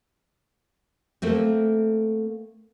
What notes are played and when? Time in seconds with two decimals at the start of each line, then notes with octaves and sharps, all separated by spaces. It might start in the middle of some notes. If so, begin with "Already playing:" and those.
1.22 A3 A#3 C4